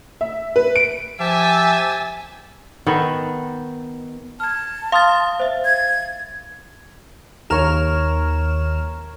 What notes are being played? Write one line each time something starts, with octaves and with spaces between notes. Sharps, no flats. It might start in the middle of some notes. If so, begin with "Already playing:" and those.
E5
B4
D7
F3 G4 E5 G#5 A5 E6 A6
D#3 B3 A4
A5 F6 G#6
F5 C6 D#6 F6 A6
C5 E5
G#6
D#2 A#4 C#5 F6 E7